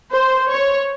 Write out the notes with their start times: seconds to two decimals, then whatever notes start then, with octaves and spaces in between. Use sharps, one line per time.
0.12 C5
0.50 C#5